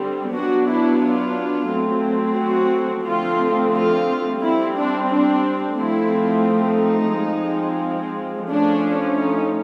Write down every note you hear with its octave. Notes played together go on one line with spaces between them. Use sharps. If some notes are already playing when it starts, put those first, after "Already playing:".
Already playing: D3 G3 C4
F#3 B3 D4 F#4
E4
F4
F#3 A3 C4
F#4
D3 F3 A3 C4 F4
F4
G3 C4 E4
D4
D4
F3 A3 C4 E4
D#4
F3 G#3 C4
F3 A3 C#4 D4
D#4